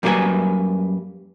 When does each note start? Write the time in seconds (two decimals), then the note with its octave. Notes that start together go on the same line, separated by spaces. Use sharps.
0.03 F#2 G3 A#3 A4 B4 G#5